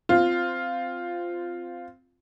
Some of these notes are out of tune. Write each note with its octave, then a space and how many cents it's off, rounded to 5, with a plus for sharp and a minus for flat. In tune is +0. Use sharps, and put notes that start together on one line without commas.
C4 -10 F4 +0